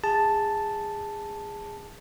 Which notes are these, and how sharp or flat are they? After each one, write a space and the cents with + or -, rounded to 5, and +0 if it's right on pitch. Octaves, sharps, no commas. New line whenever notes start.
G#4 -20 A5 +0